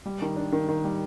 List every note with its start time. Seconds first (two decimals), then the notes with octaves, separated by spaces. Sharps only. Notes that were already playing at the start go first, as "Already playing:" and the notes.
0.06 G3
0.22 D#3
0.36 D4
0.52 D#3
0.68 D#3
0.84 G3